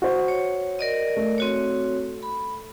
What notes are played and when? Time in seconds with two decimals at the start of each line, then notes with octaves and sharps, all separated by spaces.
0.02 F#4 C5
0.28 C#5
0.79 A#4 D5 D#5
1.17 A3
1.38 C4 F#4 C#5
2.23 B5